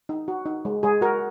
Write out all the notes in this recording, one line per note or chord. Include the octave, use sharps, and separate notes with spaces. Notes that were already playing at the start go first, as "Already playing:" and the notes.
D#4
F#4
D#4
G#3
G#3 G#4
F#4 A#4